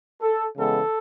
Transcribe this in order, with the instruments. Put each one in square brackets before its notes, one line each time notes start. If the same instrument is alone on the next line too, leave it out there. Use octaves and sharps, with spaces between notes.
[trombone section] A4
C#3 E3 G#3 B3 A4